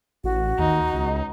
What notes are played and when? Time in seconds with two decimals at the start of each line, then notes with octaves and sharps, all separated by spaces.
0.24 A1 F#4
0.59 D#2 D#4
0.93 C#2